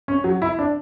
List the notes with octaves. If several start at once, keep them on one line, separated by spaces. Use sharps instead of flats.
C#4
F#3
E4
D4